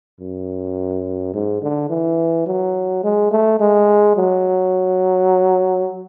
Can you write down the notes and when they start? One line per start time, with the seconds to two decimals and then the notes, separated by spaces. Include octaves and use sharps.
0.20 F#2
1.34 G#2
1.62 D3
1.90 E3
2.46 F#3
3.04 G#3
3.31 A3
3.60 G#3
4.16 F#3